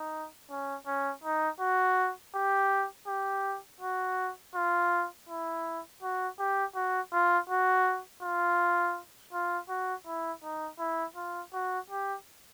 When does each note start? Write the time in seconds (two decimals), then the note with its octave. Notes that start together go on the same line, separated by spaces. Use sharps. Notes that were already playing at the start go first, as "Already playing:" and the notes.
Already playing: D#4
0.51 C#4
0.87 C#4
1.24 D#4
1.60 F#4
2.35 G4
3.07 G4
3.81 F#4
4.55 F4
5.29 E4
6.03 F#4
6.39 G4
6.75 F#4
7.13 F4
7.50 F#4
8.23 F4
9.33 F4
9.69 F#4
10.07 E4
10.44 D#4
10.79 E4
11.16 F4
11.54 F#4
11.90 G4